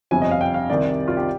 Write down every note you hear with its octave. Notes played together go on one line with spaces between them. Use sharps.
G1 F2 C3 G#5
D#5
F5
G5
F5
C2 C3 D#3 D5
F4
G4